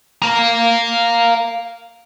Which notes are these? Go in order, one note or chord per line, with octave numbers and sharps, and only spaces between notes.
F5 A#5